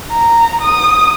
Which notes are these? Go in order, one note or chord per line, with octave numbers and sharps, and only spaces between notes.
A#5
D#6